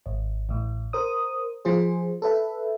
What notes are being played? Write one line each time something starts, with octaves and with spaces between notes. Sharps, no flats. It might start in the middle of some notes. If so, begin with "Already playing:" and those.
G#1
A1 A2
A#4 C5 D#6
F3 F4 G#4 C5
A4 B4 E5